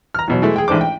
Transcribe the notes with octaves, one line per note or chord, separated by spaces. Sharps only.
A#5 F6
E2 B2 F#3
E3 G#3 A3 E4
G#4 G5
A1 G#2 D4 C5 D6
G5